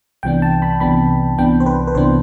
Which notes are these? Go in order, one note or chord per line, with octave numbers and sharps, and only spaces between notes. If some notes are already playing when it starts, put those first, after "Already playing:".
C2 C3 E3 B3 D4 G5
A5
B5
C2 C3 E3 B3 D4 B5
C2 C3 E3 B3 D4 G5
C5
B4
B4
C2 C3 E3 B3 D4 C5